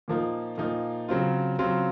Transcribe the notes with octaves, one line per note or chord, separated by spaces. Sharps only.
A#2 F3 A#3 D#4
A#2 F3 A#3 D#4
C#3 F#3 C4 F4
C#3 F#3 C4 F4